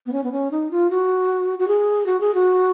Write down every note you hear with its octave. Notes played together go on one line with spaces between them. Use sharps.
B3
C#4
B3
C#4
D#4
F4
F#4
F#4
G#4
F#4
G#4
F#4